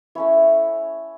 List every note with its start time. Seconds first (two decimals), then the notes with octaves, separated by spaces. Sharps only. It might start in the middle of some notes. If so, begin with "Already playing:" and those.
0.15 A3 C#4 E4 C#5